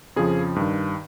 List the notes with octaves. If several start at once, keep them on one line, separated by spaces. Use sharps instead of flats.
F2 C#3 F3 G#4
G2 D#3